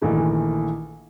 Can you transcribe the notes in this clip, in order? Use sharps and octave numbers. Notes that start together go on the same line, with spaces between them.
A#1 D#3 E3 A3